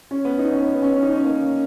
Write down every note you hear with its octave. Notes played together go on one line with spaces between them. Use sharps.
C#4
B3
D#4
C#4
B3
B3
C#4
C#4
D#4
C#4
A#3